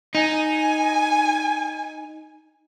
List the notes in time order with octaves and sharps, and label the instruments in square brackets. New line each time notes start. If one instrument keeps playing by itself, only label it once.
[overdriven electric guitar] D#4 [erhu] G#5